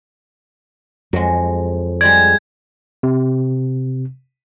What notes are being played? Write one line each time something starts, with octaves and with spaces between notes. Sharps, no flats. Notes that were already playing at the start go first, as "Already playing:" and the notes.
F2 F#3 G#3
G3 G#3 D5 G#6
C3